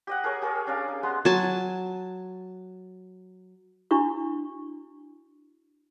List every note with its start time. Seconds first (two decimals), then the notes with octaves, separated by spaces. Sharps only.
0.07 G4 D#5 F#5
0.24 G#4 A#4 C#5 C#6
0.42 G4 G#4 A#4 C#5
0.67 C#4 D4 F5
0.88 D#4
1.03 G#3 B3 A#5 C6
1.25 F#3 G#5 A5
3.91 D4 E4 F#4 C#6